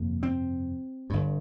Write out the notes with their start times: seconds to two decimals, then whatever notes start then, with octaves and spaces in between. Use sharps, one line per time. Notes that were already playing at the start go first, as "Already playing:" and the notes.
Already playing: G1 F2 C3 A#3
0.23 C4
1.10 G1 G2